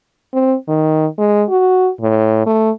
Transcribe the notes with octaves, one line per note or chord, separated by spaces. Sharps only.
C4
D#3
G#3
F#4
A2
A3